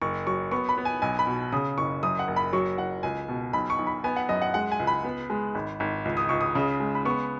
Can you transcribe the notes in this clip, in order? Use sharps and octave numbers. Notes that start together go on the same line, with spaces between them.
F#1 C#6
F#3 C#6
B3 C#6
B5
B3
G#5
B1 G#5
B5
B2
C#3 D#6
F#1 C#6
F#2 D#6
F#5
F#1
B5
F#3 C#6
F#1 F#5
C#2 G#5
B2
B1 B5
C#6
B1
B5
B3 G#5
F#5
F#2 D#5
F#5
G#3 F#5
G#5
C#2
B5
B3
G#3
G#1
G#1
C#2
D#6
C#2 C#6
D#6
C#3
G#3
B5
B3 C#6